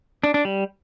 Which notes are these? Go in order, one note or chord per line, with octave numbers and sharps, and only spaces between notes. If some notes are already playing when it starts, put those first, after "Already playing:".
D4
D4
G3